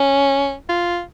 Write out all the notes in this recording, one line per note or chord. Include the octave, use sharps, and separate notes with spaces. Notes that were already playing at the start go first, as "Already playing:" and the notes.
Already playing: C#4
F4